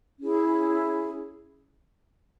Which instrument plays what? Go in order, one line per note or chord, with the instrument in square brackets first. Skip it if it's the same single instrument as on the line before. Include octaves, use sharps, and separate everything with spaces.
[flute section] C#4 E4 G#4